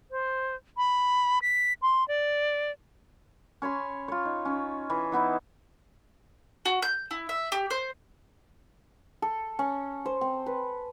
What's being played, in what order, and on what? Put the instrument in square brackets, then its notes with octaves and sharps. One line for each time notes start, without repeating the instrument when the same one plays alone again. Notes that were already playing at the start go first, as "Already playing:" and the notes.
[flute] C5
B5
B6
C6
D5
[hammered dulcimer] C#4 C#5 B5 C6
F4 C#5
D#4
C#4
E3
E3 B3 D#4 E4
[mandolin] F#4
G6
E4
E5
G4
C5
[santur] A4
C#4
C5
C4
B4